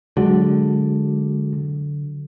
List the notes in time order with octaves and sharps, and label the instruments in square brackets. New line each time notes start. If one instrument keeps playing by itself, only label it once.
[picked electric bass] D3 [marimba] F#3 [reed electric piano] G#3 F#4